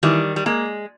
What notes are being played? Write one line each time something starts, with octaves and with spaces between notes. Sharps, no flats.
D#3 E3 G3
G3
G#3 A#3